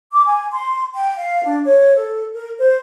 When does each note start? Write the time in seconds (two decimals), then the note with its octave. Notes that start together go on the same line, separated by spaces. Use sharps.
0.13 D6
0.25 G#5
0.52 C6
0.94 G5
1.17 F5
1.43 D4
1.65 C#5
1.96 A4
2.33 A#4
2.59 C5